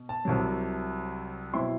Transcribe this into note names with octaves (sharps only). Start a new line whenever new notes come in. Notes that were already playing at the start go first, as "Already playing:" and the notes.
Already playing: B2
A5
C2 C3 F#3
B2 F#3 C4 E4 C6